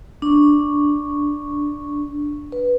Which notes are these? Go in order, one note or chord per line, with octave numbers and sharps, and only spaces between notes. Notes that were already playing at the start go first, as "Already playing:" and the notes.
D4 C#6
B4